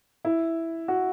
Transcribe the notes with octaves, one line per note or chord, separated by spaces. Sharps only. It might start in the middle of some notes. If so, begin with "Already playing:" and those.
E4
F#4